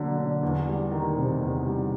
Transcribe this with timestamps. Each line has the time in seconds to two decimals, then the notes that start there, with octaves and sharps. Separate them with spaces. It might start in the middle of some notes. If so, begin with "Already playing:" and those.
Already playing: D3 F#3 A#3
0.18 D3
0.43 E2
0.66 G3
0.91 D#3
1.17 C3
1.41 E2
1.65 G3